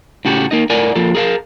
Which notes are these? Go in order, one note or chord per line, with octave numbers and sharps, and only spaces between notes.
A2 C#3 F#4 G4 A4
A#3 D#4 D#5
A2 A#4 D5 F#5 G#5
F3 A#3 A4
G#4 A#4 D5 F5 A5